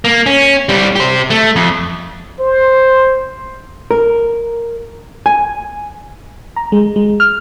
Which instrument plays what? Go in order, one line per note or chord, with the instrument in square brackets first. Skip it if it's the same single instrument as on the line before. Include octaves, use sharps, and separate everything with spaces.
[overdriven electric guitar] A#3
C#4
G3 C4
G4 C5
A3
F2
[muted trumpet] C5
[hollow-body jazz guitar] A#4
G#5
[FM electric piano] A#5
G#3
G#3
F6